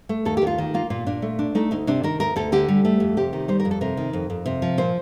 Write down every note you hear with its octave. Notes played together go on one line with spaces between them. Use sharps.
A3
D#2 A4
G4
D#2
F4
D#3
A#3 F4
A#2 F4
A#2 D4
A3
D4
A3 D#4
D2 D#4
C3 D4
D#3 A#4
D2 A#4
D2 A4
D3 G4
G3
A3
F2
C3 G4
D#3
G3 C5
A#4
F2
A4
C3 A#4
D#3
F2
F2
C3
F3
A#2 C5